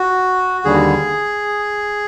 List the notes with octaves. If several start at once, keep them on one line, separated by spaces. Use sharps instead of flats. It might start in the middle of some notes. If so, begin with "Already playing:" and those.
Already playing: F#4
D#2 D3 G3 G#4